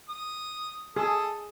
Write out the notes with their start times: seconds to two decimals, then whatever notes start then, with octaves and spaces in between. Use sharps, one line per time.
0.09 D#6
0.96 G#4 A4 D#6